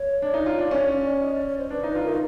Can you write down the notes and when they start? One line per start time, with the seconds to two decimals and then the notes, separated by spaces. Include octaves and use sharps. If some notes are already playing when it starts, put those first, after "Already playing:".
Already playing: C#5
0.22 D4
0.34 D#4
0.46 F4
0.59 D4
0.71 C#4 C#5
0.89 D5
1.10 D5
1.21 D#5
1.34 D5
1.46 C#5
1.58 C5
1.70 D4 B4
1.83 D#4
1.88 B4
1.95 F4
2.04 D#4 A#4